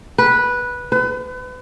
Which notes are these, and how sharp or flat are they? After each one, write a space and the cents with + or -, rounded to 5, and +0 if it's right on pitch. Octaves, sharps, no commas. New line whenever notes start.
B4 -10
B4 +35